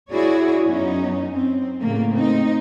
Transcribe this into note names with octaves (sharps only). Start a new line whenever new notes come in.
E4 F#4 G#4 C#5 D5
F#2 B3 C#4 D#4
C4
A2 C#3 A#3
C4 D#4